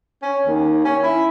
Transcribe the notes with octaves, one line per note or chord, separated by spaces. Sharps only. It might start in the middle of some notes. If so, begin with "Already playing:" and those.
C#4
D#2
C#4
E4